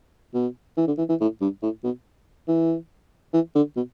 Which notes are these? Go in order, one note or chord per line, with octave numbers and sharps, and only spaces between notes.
B2
E3
D3
E3
E3
A2
G2
A2
B2
E3
E3
D3
B2